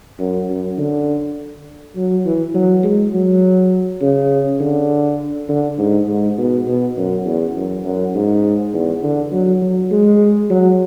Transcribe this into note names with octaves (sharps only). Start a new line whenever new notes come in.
F#2
F#2
D3
F#3
E3
F#3
G#3
F#3
C#3
D3
D3
G#2
G#2
B2
B2
F#2
E2
F#2
F#2
G#2
E2
D3
F#3
F#3
G#3
F#3